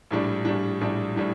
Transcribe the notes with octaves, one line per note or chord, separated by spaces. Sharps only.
A#1 A2 G3 D4
A#1 A2 G3 D4
A#1 A2 G3 D4
A2 G3 D4